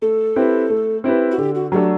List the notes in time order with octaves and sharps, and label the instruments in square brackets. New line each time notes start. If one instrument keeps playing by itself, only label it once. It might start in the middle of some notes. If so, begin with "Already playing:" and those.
[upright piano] A3 [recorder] A4
[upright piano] C4 E4 G4 B4
A3
C4 E4 G4 B4
[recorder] F#4
[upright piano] D3 [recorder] G4
[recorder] F#4
[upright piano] F#3 A3 D4 A4 [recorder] G4